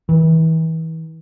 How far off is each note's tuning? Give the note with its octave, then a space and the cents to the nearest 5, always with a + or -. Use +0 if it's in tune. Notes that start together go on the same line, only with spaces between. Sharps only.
E3 -35